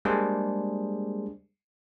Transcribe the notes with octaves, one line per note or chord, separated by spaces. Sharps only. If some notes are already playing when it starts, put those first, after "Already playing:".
G3 G#3 A#3 D4 G#4 C5